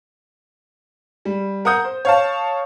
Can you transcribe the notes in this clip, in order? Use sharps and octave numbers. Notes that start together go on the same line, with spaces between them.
G3
A#4 F#5 D#6 G6
C5
C#5 F5 A5